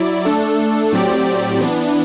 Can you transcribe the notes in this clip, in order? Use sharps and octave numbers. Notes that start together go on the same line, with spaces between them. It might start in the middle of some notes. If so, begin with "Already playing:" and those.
Already playing: F#3 E4 D5
A3 D4 A4
A2 F#3 C4 G4 D5
E3 B3 D4